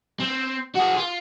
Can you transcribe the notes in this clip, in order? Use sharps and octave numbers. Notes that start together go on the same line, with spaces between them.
C4
F#4 G#4
F4